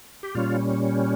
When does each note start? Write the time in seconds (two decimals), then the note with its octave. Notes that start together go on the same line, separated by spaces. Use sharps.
0.23 G4
0.35 A#2 G3 C#4 F4